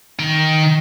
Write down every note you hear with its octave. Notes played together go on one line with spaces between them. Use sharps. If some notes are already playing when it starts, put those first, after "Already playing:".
D#3 G5